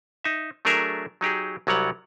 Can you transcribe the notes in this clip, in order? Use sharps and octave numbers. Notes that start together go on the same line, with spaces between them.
D#4 E5
F#3 A3 D4 G#4 A#4 E5
F#3 D#4 G4 G#4
C2 F#3 G3 C#5 F#5